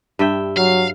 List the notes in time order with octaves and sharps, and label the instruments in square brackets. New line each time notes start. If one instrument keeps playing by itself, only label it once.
[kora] G2 E5 G5
[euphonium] F#3 [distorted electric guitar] F5